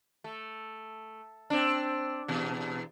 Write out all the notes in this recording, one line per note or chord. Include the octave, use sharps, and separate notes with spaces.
A3
C4 D4
E2 B2